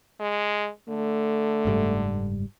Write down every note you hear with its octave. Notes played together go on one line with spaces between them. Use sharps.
G#3
D3 A3
F#1 G#2 G3